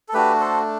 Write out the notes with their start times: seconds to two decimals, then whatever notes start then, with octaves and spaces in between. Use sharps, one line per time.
0.09 A4
0.14 A3 D4 F#4 G4 B4
0.40 A4 C5